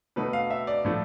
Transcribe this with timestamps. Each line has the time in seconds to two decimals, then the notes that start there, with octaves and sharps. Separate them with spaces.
0.16 B2 A3 B4
0.33 F5
0.50 E5
0.67 D5
0.85 A2 F3 A3